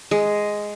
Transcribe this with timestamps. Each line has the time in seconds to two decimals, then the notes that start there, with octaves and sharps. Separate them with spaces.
0.11 G#3